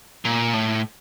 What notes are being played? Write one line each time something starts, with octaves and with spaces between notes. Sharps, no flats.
A#2
A2